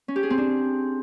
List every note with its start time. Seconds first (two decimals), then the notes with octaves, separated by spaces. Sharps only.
0.08 C#4
0.16 G4
0.23 G#4
0.30 C4
0.38 D4